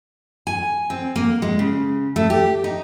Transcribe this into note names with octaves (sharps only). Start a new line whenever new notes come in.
G#5
C4
A#3
G#3
C#3
A3
G4
D#4